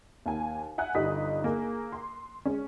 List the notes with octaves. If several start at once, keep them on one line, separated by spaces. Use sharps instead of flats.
D#2 G#5
E5 F#5 G#5 F#6
G1 G3 D#4 D#6 B6
A#3 G#4
C6
G#3 C#4